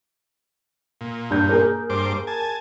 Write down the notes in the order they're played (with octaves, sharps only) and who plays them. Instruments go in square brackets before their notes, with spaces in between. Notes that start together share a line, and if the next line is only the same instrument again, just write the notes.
[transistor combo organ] A#2
[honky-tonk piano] G2 G6
A#3 G#4 A#4
[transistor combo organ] G2 C5 D6
G#5 A5